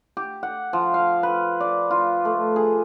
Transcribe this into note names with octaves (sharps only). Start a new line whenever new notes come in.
G4
F#5
F3
F5
B4
D5
F4
A3
G#4